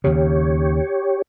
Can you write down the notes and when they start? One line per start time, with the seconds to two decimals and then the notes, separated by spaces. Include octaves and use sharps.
0.04 D#2 C#3 G4 C#5